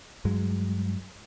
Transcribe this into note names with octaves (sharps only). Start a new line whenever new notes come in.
G2 F#3 G#3